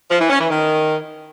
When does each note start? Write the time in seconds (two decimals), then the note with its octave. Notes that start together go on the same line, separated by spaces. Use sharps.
0.10 F3
0.20 E3
0.30 C#4
0.40 E3
0.50 D#3